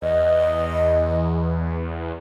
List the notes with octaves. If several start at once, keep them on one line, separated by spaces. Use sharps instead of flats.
E2 D#5